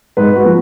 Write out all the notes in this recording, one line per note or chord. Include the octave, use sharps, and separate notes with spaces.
G#2 B4
F#4
F3 A#3